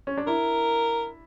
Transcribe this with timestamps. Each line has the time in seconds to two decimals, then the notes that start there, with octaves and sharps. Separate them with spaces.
0.07 C#4
0.17 D4
0.27 E4 A#4